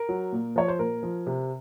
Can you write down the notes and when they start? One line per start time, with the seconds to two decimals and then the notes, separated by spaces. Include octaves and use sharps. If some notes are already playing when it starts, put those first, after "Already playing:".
Already playing: A#4
0.09 F#3
0.32 A#2
0.56 F3 C#5
0.68 C5
0.79 A#2 A#4
1.03 F3
1.27 C3